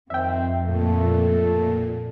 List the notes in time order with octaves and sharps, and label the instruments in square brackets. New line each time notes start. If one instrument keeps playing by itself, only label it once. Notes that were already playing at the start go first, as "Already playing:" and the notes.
[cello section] F2 [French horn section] D#3 C4 [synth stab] E5 G5
[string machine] A#2 [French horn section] A3 A4